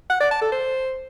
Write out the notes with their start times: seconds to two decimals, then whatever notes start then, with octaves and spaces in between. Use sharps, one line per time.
0.10 F#5
0.20 D5
0.31 A5
0.41 A4
0.52 C5